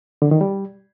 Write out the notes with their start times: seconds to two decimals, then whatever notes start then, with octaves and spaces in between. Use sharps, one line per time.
0.22 D3
0.31 D#3
0.41 G3